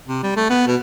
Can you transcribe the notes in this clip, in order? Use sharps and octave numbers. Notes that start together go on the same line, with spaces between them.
C3
G3
A3
B3
B2